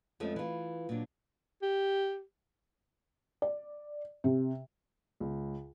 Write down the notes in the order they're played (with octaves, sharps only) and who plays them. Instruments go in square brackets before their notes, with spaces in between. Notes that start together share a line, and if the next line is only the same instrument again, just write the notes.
[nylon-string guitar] F2 F3 G#3 A3 C#4
E3 F4
A#2 F#3 D4
[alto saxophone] G4
[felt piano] D5
C3
C#2